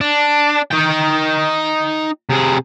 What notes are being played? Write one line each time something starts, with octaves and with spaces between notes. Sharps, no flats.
D4
D#4 G5
C3 G#4